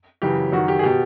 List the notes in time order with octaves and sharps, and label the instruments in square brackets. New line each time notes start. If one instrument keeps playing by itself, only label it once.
[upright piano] F#2 C#3 E3 G4
F#2 D#3 F#4
G4
G#4
B2 G4